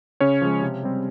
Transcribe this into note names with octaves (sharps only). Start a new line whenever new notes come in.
C#3 C#4 C#5
F3 G#3
C3
G3 C4